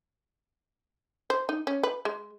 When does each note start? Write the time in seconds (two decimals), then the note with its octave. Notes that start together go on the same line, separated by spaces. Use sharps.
1.30 C5
1.49 D#4
1.67 C#4
1.83 B4
2.05 G#3